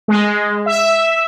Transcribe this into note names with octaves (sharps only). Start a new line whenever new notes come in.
G#3
E5